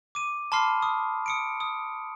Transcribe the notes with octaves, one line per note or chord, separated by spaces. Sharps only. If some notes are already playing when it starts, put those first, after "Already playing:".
D6 D#7
A5 B5 C6 D6 F6 C7
C#6 D#6
D#6 C#7 D7
D#6